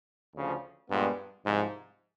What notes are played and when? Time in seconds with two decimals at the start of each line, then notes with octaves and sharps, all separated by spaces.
0.35 D2 C#3 F3
0.90 G2 A#2 F3 G#3 B3
1.45 C2 G#2 C3 F3